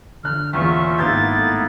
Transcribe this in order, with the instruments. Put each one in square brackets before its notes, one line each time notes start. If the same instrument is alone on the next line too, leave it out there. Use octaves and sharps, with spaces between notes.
[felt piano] D3 F#6 [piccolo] F6
[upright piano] E2 A#2 [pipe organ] C#4 F4 E5 [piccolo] C#6
[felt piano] G#1 B4 E6 [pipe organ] A#3 B3 E4 [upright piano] G6 [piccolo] A6
[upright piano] A2